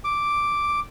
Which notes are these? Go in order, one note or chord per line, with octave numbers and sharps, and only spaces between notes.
D6